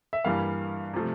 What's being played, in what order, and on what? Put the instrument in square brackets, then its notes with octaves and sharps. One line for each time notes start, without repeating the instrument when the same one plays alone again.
[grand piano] E5
G2 E3 G3 A#3 F5
C3 F3 A3